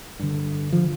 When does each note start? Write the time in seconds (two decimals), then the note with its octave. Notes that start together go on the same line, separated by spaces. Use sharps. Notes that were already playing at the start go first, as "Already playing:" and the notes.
0.19 G2 D3
0.73 F3